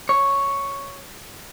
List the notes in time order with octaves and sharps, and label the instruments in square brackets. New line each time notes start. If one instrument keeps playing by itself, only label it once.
[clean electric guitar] C#5